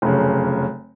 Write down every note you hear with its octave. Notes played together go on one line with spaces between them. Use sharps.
F1 F#2 C#3